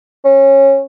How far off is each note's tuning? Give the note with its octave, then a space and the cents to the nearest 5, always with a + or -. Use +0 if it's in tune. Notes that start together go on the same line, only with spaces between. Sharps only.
C#4 -20